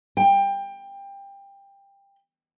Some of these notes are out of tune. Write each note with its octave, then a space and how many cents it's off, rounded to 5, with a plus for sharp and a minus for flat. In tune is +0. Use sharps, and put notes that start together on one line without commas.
G5 +20